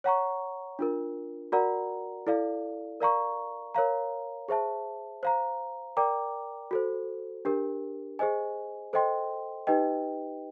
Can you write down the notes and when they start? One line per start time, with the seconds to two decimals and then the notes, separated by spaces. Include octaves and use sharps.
0.04 C#5 F#5 A#5 C#6
0.79 D4 F4 A#4
1.52 F#4 A#4 D5 F#5 A#5
2.27 E4 A4 D5 F5
3.00 A#4 D5 F5 A#5 C#6
3.75 A#4 C#5 F5 A#5
4.49 G#4 C5 E5 A5
5.23 C5 F5 A#5
5.97 A#4 D5 G5 A#5 D6
6.71 F#4 A4 C5
7.45 D4 G4 A#4
8.19 G#4 C5 D#5 G#5
8.93 A4 C5 D#5 G5 C6
9.67 D#4 G4 B4 D#5 G5